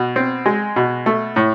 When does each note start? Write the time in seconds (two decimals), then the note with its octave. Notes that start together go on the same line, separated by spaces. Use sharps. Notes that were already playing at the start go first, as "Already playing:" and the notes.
Already playing: B2
0.16 C4
0.46 G#3
0.76 B2
1.06 A3
1.36 A2